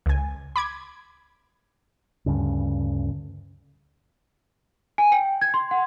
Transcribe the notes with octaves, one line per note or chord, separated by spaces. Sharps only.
C#2 G#5
B5 D6 G#6
D2 G2 C#3
G#5
G5
G#6
C6
F#5